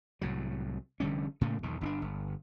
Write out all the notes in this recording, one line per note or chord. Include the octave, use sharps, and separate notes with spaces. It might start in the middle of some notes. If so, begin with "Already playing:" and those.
C2 A2 F#3
F1 D3 G3 C#4
A2 C#3 A3 A#3
B1 E2 D#3
G1 C#4 D4
G1